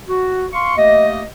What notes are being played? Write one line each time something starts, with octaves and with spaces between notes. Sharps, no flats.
F#4
F5 C6 C#6
A3 A#3 G4 D#5